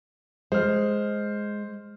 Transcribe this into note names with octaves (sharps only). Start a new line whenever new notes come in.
G#3 C5 F6